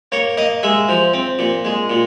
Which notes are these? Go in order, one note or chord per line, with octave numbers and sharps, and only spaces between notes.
A#3 C#5
A#3 D#5
G#3 E5
F3
C4
A#2
G#3
A#2